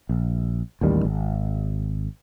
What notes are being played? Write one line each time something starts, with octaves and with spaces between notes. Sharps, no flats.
A#1
A1 D#2 D#3 G3
G#1